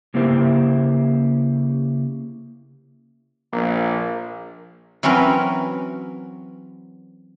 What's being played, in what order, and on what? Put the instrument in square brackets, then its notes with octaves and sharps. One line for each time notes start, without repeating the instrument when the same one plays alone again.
[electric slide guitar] C#3 A#3 E4 G4 C5 E5
[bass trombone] A#1 [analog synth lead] A#3
[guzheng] E3 F#3 C4 C#4 A#4 B4